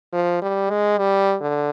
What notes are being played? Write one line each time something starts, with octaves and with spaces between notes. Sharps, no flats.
F3
G3
G#3
G3
D3